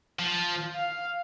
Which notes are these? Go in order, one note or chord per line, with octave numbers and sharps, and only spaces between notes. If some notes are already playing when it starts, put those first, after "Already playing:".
F3
F5